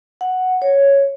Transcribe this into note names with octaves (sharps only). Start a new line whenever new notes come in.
F#5
C#5